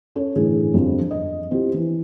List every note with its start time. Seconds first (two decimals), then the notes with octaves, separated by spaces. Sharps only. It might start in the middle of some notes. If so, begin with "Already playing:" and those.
0.15 C#4 A4 C#5
0.36 G1 A2 E3 G#4
0.74 G1 F2 F3 G3
1.11 D#5
1.51 F3 C4 E4 G4
1.74 E3